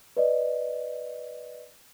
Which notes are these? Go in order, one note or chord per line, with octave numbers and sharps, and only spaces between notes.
B4 D5 D#5